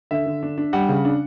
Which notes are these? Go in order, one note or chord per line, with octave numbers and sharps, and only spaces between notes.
D3 E5
D3
D4
D4
G3 F#5
C#3
D4